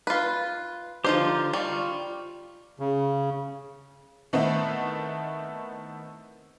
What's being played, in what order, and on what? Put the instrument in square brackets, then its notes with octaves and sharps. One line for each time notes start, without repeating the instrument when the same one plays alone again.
[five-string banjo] F4 B4
[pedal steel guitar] D3 F4 G4 [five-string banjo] F3 D#4 C5
[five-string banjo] G3 [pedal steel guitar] F4 C#6
[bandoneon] C#3
[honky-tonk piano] D#3 A3 B3 C4 D#4 E4